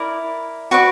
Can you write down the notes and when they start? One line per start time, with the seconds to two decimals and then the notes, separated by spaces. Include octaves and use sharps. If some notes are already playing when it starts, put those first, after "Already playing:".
Already playing: E4 A#4 D5
0.71 F#4 B4 D5 C#6